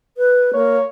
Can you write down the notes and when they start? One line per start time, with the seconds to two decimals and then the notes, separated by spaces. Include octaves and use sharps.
0.17 B4
0.54 A#3 C#5